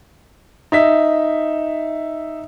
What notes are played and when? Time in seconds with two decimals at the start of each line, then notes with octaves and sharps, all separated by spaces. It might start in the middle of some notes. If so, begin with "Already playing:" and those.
0.72 D#4 E5 B6